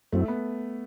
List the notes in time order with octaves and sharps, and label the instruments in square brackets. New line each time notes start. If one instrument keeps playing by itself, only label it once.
[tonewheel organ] F#2 F#3 C4 E4 [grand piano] A3
[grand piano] B3